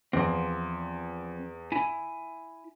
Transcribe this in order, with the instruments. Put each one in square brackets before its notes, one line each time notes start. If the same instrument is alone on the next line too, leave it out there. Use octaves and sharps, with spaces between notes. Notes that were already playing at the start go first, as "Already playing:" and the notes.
[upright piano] E2 [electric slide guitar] F3 C4
[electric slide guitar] E4 G#5